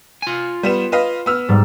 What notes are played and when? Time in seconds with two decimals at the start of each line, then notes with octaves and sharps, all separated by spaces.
0.22 F4 G#5
0.63 G3 B3 E7
0.92 B4 D#5 F5
1.26 B3 E6 F6
1.49 G#2 G3